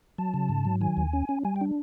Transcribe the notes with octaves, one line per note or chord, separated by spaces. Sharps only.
F#3 A5
C#3
G#2
F#3
D#3 G#5
D#2
C#4
C#4
G3 G#5
G5
D4